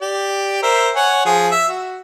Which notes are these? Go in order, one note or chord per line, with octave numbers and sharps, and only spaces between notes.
G4 D5
A#4 C5 E5
C#5 F#5 G#5
F3 G#4
E5
F#4